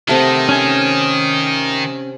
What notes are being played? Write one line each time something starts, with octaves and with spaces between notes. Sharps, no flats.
C3 D#3 A3 F#5
C#4 G#5